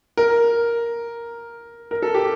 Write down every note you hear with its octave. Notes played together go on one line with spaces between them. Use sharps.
A#4
A#4
A4
G4